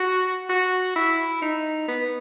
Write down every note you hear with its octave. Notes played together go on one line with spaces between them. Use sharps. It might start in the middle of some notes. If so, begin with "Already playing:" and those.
Already playing: F#4
F#4
E4
D#4
B3